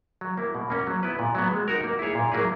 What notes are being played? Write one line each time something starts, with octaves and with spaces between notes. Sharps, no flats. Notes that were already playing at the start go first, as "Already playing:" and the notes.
F#3
A#3 E4
B2
A#3 C#4
F#3
B3 E4 B4
A#2
F#3 B3
G#3
D#4 F#4 A#4
A#3
E4 G#4 C#5
A#2
F#3 A#3 E4 G#4